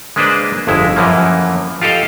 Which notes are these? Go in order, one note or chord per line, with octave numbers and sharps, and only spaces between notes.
G#3 A#3 D4 B4 C5 D5
G1 F2 G#3 E4
F#2 E3 F3 A#3
F4 G4 A4 D#5 F5